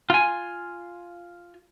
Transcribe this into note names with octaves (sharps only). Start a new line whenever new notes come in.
F4 G#5